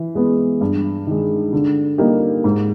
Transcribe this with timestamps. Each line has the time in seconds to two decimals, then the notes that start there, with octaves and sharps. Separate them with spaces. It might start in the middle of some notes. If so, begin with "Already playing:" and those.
Already playing: E3
0.15 G#3 B3
0.61 G2
1.07 D#3 G#3
1.53 D3
1.98 G3 A#3 D#4 G4
2.44 G#2